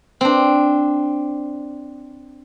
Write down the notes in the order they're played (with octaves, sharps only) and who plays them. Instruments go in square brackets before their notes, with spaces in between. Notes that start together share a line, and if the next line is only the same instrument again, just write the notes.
[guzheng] C4 D4